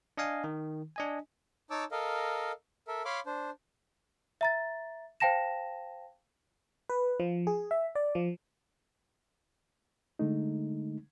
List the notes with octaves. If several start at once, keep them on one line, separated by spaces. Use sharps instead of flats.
D4 D#5 F5 G#5
D#3
D4 D#5 G#5
D#4 C#5 A5 D6 E6
A4 A#4 D#5 F5
A4 A#4 E5
C#5 F5 B5 C6 D6
D4 C5
E5 A#5 A6
C5 F5 G5 A5 A#6 E7
B4
F3
G#4
E5
D5
F3
D3 G#3 A3 D#4